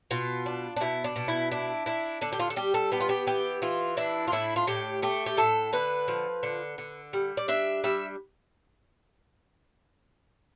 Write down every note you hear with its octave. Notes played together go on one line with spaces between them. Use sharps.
B2 F4
D4
D4
B2 E4
D4
B2
E4
D4 E4
D4 E4
D3 D4
G4
F4
A4
G3 G4
A4
B3 G4
F4
G4
E3 G4
E3 F4
D4 E4
F4
A2 E4
F4
A2 G4
A3 G4
G4
A2 A4
D3 B4
F3
D3
D3
G3
D5
D4 E5
G3 E5